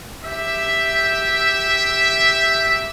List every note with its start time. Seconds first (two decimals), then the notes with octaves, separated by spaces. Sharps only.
0.24 G4 E5